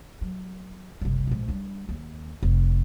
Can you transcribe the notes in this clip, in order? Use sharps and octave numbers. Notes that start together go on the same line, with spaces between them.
F#3
F#1 C2
A#1 G#2
G3 D4
D#2
F1